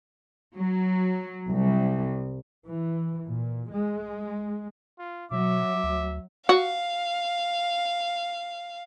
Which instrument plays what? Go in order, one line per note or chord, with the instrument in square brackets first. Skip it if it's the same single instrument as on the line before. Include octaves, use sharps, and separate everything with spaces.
[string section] F#3
C2
[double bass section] E3
A#2
G#3
[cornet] F4
[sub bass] B2 [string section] F#3 [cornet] E5 [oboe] D6
[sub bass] D2
[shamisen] F#4 [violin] F5